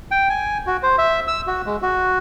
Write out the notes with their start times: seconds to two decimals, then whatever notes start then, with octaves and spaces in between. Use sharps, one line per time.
0.11 G5
0.29 G#5
0.67 F#4
0.83 C5
0.98 E5
1.28 E6
1.47 F#4
1.66 G#3
1.82 F#4